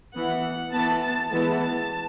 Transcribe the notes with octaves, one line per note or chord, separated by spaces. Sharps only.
E3 B3 F#5
E3 B3 A5
A5
E3 G#3 B3 A5
A5